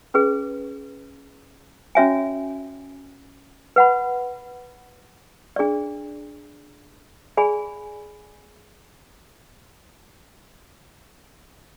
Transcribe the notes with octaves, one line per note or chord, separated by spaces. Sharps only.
C#4 G#4 B4
C#4 F#4 C#5 E5 G#5
B4 F#5 B5
D4 G#4 D5
G#4 D5 G#5 B5